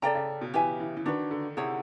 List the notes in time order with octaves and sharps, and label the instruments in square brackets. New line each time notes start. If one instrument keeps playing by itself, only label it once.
[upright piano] C#3 [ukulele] A4 D5 G5 A#5
[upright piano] C#3
B2
[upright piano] E3 [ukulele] G4 B4 E5 G#5
[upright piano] E3
E3
[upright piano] D#3 [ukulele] D4 F#4 B4
[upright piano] D3
[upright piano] C3 [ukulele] E4 G#4 C#5 F#5